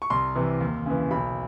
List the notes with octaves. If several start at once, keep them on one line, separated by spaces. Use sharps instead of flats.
C#6
C2 C6
C3 E3
D#2
C#3 E3
B1 B5